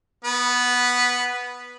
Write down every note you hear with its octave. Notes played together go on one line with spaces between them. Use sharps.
B3 B4